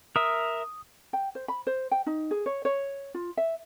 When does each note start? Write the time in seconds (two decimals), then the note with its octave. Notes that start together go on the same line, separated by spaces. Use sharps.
0.16 A#4 E5 D#6
1.13 G5
1.35 C5
1.48 B5
1.67 C5
1.91 G5
2.07 D#4
2.31 G#4
2.46 C#5
2.65 C#5
3.14 F4
3.37 E5